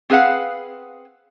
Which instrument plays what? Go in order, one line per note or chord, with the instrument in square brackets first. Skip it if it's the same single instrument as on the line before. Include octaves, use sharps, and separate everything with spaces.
[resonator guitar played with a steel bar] C4 G#4 B4 F5 F#5